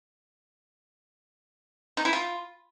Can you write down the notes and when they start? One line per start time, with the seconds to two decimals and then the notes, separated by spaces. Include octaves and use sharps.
1.97 D#4
2.05 E4
2.13 F4